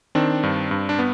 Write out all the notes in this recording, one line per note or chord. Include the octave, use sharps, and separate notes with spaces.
D#3 C4 D4
G2
G2
D4
B3